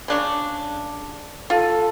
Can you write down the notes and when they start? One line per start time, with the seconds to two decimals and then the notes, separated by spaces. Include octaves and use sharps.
0.08 C#3 D4 C#5
1.50 F4 A4